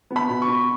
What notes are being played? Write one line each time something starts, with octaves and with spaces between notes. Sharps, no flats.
B3
B5
B2
C#6
B2